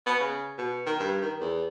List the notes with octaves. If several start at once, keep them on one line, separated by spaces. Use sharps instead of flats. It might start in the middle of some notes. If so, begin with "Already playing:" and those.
B3
C#3
B2
D#3
G2
D#3
E2